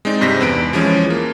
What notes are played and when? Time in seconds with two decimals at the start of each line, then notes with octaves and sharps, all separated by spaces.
0.05 G#3 C4 D#4 D5
0.21 G2 C3 C5 A#6 B6
0.41 E2 B4 D7
0.73 E3 F3 G#3 C#4
1.10 A#3